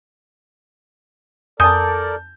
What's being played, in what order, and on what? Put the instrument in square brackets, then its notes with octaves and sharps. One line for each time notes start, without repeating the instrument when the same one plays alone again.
[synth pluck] F2 G#5 [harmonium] A4 A#4 D5 [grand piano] A5 G6 [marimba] D#6